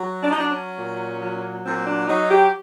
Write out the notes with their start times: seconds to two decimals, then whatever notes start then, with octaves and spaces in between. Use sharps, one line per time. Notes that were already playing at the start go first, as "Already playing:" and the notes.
Already playing: F#3
0.22 D4
0.30 D#4
0.37 F#3 D4
0.51 C#4
0.79 A#2
1.21 F#3
1.64 A#2 C4
1.85 D4
2.06 F#3 D#4
2.28 G4